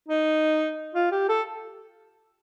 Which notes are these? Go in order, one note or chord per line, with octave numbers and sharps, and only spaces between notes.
D#4
F4
G4
A4